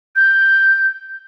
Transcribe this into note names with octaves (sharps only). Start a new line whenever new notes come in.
G6